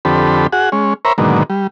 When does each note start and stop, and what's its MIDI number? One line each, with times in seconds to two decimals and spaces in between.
0.05 0.47 41
0.05 0.47 50
0.05 0.47 60
0.05 0.47 67
0.05 0.47 69
0.05 0.47 83
0.52 0.70 66
0.52 0.70 68
0.52 0.70 78
0.72 0.94 56
0.72 0.94 61
1.05 1.13 70
1.05 1.13 72
1.05 1.13 73
1.05 1.13 76
1.05 1.13 82
1.05 1.13 83
1.18 1.43 44
1.18 1.43 47
1.18 1.43 50
1.18 1.43 51
1.18 1.43 54
1.18 1.43 58
1.50 1.67 55